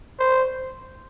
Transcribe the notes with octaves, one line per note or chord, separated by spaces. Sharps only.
C5